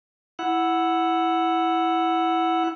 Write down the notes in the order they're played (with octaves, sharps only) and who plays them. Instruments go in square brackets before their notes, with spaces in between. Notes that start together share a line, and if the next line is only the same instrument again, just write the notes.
[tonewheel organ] E4 F#5